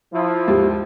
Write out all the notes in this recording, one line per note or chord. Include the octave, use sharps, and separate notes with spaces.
F3 E4
D#2 G#2 G3